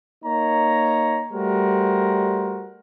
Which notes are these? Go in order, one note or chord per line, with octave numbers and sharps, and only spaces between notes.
A#3 D#4 C#5 A#5
G3 A3 F#4 A#4 C5